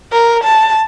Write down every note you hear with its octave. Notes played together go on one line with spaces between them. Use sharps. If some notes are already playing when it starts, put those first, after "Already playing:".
A#4
A5